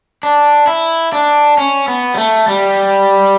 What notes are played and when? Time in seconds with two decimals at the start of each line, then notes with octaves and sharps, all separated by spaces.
0.23 D4
0.67 E4
1.13 D4
1.58 C#4
1.88 B3
2.14 G3
2.17 A3
2.48 G3